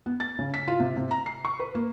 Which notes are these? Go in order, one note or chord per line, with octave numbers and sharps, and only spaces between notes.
B3
A6
C#3
B6
F4
C3
C3
A#5
C7
C#6
B4
A#3